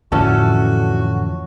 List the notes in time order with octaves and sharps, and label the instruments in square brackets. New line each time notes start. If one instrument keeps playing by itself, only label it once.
[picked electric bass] F2 D3 E3 [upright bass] A2 [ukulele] C#4 A4 A5 [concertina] F#4